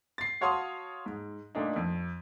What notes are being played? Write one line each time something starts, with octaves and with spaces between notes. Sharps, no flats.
A6 C7
F#4 C#5 F5 A5 C6 D#6
G#2
A#2 A3 D4 D#4
F2